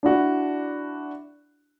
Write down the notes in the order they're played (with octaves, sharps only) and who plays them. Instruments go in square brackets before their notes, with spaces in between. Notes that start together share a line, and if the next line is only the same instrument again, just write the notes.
[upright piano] D4 E4 F#4